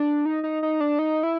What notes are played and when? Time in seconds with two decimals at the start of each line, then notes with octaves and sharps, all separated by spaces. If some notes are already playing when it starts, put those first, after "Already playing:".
Already playing: D4
0.25 D#4
0.43 D#4
0.63 D#4
0.80 D4
0.99 D#4
1.23 E4